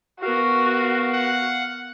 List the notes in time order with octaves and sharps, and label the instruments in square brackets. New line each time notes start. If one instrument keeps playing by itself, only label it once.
[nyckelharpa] B3 A#4 [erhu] F#4 [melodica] F5
[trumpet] F#5